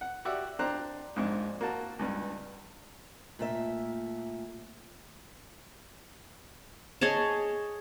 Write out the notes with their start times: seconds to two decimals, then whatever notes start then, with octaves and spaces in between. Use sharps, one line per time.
0.01 F#5
0.25 F#4 G4 D5 E5 F#5
0.59 D4 C5 G5 A#5 F#6
1.16 A#1 G#2 D4
1.61 A#3 F#4 A5
1.99 C#2 G2 B4
3.39 A#2 A3 E5
7.01 G#4 C#5 D#5 A5